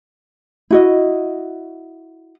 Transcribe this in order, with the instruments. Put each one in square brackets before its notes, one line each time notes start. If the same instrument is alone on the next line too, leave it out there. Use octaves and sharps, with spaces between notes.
[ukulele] E4 F#4 D#5